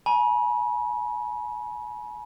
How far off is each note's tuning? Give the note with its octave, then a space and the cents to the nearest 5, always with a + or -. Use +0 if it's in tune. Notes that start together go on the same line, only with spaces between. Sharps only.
G#5 +35 B5 -40